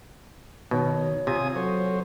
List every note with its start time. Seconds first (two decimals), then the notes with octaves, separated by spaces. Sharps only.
0.71 B2 D#3 C#5
1.27 C3 F4 G#5 D#6
1.56 F#3 A4 C5 C#5